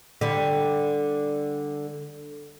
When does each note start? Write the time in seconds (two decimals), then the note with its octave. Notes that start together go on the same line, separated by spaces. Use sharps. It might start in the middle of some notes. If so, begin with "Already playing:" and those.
0.21 D3 G3